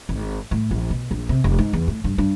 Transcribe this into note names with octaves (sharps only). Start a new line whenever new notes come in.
G#1
A2
A#1
B2
A#1
C3
F1
G#2
E2
A2
G2
G2